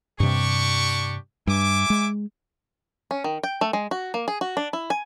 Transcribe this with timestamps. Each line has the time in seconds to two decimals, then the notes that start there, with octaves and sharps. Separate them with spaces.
0.20 G2 C3 D4 G4 C#6
1.47 G2 E5 G#5 D6
1.90 G#3
3.11 C#4
3.24 D#3
3.43 G5
3.61 A3
3.73 G#3
3.91 F#4
4.14 A#3
4.28 G#4
4.41 F#4
4.57 D4
4.73 E4
4.90 G#5